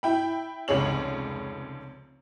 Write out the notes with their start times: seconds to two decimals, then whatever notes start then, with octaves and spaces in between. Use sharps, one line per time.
0.03 E4 G5 B5
0.68 F1 C#2 G#4 C#5 F#7